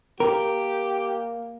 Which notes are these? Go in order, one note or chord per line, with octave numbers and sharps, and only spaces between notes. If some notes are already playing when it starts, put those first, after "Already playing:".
A#3 G4 A#4